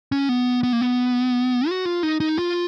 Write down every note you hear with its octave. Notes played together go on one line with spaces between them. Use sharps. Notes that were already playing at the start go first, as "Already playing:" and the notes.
C#4
B3
B3
A#3
B3
F#4
F4
D#4
D#4
F4